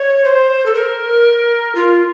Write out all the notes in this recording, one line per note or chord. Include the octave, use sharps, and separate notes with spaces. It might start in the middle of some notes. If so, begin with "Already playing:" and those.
Already playing: C#5
C5
A4
A#4
F4